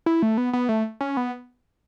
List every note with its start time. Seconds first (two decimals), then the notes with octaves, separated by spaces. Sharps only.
0.06 E4
0.22 A3
0.38 B3
0.53 B3
0.69 A3
1.01 C#4
1.17 B3